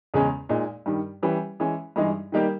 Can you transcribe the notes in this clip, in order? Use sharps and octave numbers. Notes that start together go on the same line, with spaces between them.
E2 C#3 G#3 C#4
A#2 G#3 D#4
G2 D#3 G3
E3 G3 C#4 G4 B4
E3 G#3 C#4
G2 E3 G#3 D#4 G#4
D#3 G3 A#3 D#4 G4